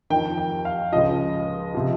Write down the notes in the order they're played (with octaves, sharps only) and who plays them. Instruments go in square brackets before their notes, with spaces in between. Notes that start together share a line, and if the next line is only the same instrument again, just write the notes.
[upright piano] F2 D#3 G5
G5
F5
C#2 C#3 F3 D#5
C3 F3